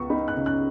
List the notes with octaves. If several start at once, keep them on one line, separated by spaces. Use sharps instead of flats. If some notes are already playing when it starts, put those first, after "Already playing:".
Already playing: C#2 B3 C#6
D#4 B5
F#6
C#3
F#6